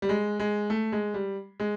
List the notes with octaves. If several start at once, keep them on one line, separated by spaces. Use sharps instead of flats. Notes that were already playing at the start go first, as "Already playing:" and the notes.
G3
G#3
G#3
A3
G#3
G3
G#3